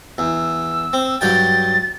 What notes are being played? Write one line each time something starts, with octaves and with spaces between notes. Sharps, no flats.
E2 E6
C4
G2 F#3 G5 A6